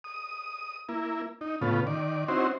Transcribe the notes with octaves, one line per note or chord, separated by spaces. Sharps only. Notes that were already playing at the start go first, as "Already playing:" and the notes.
D#6
A#3 E4
D#4
A2 C#3 B3 F4
D#3 D5
C4 C#4 D#4 E4 F#4 C5